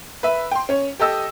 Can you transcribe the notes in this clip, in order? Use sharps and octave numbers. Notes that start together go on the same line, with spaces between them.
B4 E5
G5 C6
C#4 C#5
G4 A4 D#5 E6